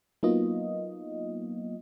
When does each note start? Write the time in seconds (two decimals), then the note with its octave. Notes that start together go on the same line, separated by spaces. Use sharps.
0.23 F#3 A#3 B3 D#4 F4 D#5